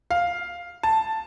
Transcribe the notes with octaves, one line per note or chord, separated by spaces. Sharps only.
F5
A5